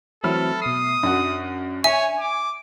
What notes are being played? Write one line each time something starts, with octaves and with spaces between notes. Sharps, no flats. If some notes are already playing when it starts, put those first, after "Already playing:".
E3 F#3 A3 C4 A4 B5 F6
B2 D#6 C7
F#2 D4 F#4
C#5 E5 G#5
D6